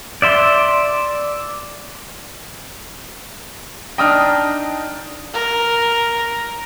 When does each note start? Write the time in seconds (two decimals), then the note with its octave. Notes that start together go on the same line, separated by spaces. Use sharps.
0.22 D5 E5 C6
3.98 D4 D#4 D#5 G5 D#6 F6
5.34 A#4